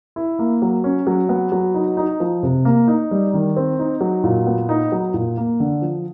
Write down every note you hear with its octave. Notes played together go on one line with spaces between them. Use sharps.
E4
A#3
F#3
C#4
F#3
B3
F#3
D#4
D#4
F3
C3
A#3
D#4
G3
D#3
C4
D#4
F#3
A#2
B3
D#4
F#3
A#2
A#3
D3
F3